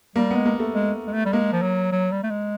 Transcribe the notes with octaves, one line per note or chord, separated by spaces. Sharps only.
G3 A#3
B3
G#3
A#3
A3
G#3
G#3
A3
G3
G#3 A#3
F3
F#3
F#3
G3
A3
G#3